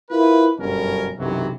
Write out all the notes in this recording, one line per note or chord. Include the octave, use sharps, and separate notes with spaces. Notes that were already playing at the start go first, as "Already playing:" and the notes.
E4 F4 A#4 B4
G1 F#2 B2 C#4 A#4
B1 F#2 C3 E3 F#3